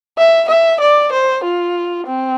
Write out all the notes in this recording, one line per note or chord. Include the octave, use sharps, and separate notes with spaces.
E5
E5
D5
C5
F4
C4